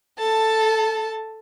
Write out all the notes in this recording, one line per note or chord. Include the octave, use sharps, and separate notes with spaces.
A4 A5